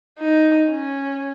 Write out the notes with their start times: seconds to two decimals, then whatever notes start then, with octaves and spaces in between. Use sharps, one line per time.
0.19 D#4
0.69 C#4